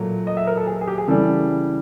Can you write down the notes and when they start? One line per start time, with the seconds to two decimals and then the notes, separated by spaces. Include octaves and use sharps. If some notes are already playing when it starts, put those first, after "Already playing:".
Already playing: A#2 F#3 A3
0.27 D#5
0.37 E5
0.47 A#4
0.57 A4
0.67 G#4
0.81 G#4
0.88 G4
0.98 G#4
1.08 C#3 E3 G3 A4